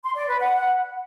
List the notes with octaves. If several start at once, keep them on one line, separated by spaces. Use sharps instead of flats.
C6
D5
B4
F#5